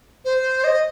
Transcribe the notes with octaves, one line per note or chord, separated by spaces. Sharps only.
C5
D#5